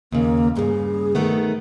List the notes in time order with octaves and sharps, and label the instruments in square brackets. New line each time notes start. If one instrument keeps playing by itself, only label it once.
[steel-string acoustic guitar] D#2 C#3 [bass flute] A#3
[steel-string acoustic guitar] G2 C#3 [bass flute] G#4
[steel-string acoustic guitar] D#3 A3 B3